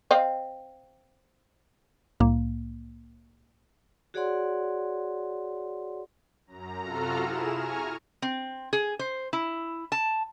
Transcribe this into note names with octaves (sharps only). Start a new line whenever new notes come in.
C4 D#5 F5
C2 A2 A#3
F#4 G#4 C#5 D5 F#5 C6
F#2 A#5
C3 F4 F#4 A4 A#5 F6
E4 G#4 E7
G#5 A#5 C#6 F6
C4
G#4
C5
E4
A5